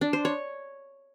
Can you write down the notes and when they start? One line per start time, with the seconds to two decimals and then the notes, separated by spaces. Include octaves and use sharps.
0.01 D4
0.13 C5
0.25 C#5